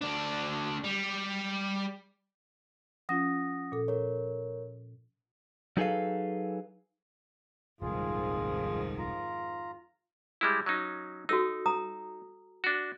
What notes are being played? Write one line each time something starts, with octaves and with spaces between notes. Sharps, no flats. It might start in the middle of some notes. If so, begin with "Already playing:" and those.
D2 D4
G3
F3 C#4 F4 F#5 D#6 A#6
A#2 A4
A#4 C#5
F#3 D#4 G#4 A4 B4 F5
D#1 C2 F2 G#2 D#3 F4 G#4
F4 A#5
G3 G#3 E4
F#3 C#4 D#4
D#4 F#4 A4 E6
A#5 D#6
D4 F#4